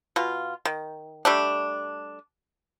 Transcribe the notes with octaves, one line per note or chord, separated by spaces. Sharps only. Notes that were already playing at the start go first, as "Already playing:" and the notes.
B2 F4
D#3
G3 A3 D4